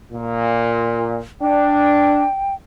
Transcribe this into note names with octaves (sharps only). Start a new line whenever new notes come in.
A#2
D4 G5